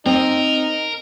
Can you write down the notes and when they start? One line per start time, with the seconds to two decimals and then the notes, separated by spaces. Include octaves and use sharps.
0.06 C4 D#4 A#4